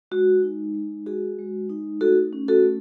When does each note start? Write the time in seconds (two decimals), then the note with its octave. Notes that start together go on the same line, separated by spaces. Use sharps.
0.11 G#3 F#4
0.43 D#4
0.74 G#3
1.06 F#4 G#4
1.38 G#3
1.70 D#4
2.01 A3 F#4 A4
2.33 C#4
2.48 F#4 A4
2.64 A3